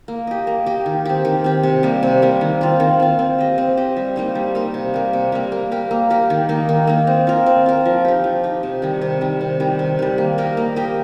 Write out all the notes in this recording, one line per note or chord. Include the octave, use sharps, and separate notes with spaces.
A#3
G4 D#5
A#3
G4 D#5
D#3
C4 G4
D#3
C4 G4
C3
G3 A#3
C3
G3 A#3
D#3
C4 F4
D#3
C4 F4
C4
G4 D#5
C4
G4 D#5
G3
A#3 D#4 C5
G3
A#3 D#4 C5
C3
G3 A#3
C3
G3 A#3
A#3
G4 A#4
A#3
G4 A#4
D#3
A#3 D#4
D#3
A#3 D#4
C4
F4 A#4
C4
F4 A#4
F3
D#4 G4
F3
D#4 G4
C3
D#3 G3
C3
D#3 G3
C3
D#3 G3
C3
D#3 G3
A#3
G4 A#4 D#5
A#3
G4 A#4 D#5